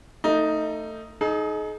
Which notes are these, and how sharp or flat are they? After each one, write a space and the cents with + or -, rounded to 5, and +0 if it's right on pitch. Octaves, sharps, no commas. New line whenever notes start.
A3 +25 D#4 +0
D#4 +0 G#4 +40